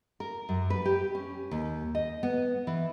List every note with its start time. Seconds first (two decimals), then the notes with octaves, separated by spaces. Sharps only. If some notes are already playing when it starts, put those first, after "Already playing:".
0.20 A#4
0.49 F#2
0.70 B4
0.85 G4
1.15 C#4
1.51 D#2
1.95 D#5
2.23 B3
2.67 E3